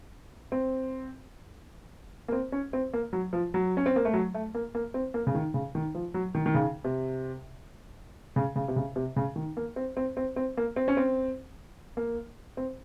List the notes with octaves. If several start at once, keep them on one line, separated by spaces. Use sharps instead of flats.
C4
A#3
C4
C#4
C4
A#3
F#3
F3
F#3
C#4
C4
A#3
A3
F#3
A3
A#3
A#3
C4
A#3
C#3
D#3
C#3
D#3
F3
F#3
D#3
D#3
C#3
C3
C#3
C#3
C3
C#3
C3
C#3
D#3
A#3
C4
C4
C4
C4
A#3
C4
C#4
C4
A#3
C4